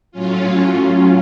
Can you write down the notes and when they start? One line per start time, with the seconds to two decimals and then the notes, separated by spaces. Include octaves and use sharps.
0.12 A2 F#3 C#4 F4